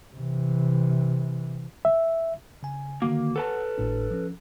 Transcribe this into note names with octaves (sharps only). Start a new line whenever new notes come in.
C3 E3
E5
C#3 G#5
D3 D#3 A#3 F#4
A4 B4 F#5 A5
G#1 A2 D4
F3 C#4